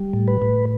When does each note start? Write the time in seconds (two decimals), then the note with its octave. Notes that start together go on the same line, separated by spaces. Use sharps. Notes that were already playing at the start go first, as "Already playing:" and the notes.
Already playing: G3
0.13 A2
0.28 B4
0.42 A2